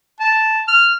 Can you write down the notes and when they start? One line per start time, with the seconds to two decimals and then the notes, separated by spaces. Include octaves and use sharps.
0.20 A5
0.68 F6